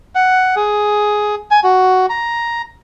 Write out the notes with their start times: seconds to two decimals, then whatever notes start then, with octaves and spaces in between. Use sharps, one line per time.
0.15 F#5
0.56 G#4
1.51 G#5
1.64 F#4
2.10 A#5